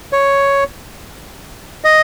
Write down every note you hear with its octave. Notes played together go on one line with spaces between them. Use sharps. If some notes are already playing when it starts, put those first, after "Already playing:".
C#5
D#5